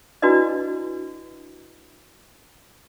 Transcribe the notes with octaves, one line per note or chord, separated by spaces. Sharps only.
D4 E4 F#4 B4 D5 D#5